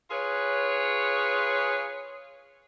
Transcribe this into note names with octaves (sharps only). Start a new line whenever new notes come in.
F4 G#4 B4 C#5